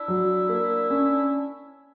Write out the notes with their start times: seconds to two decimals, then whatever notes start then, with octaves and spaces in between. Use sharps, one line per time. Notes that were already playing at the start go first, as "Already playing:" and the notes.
Already playing: D4 E4
0.08 F#3
0.49 A#3
0.90 C#4